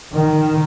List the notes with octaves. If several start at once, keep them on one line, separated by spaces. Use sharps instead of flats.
D#3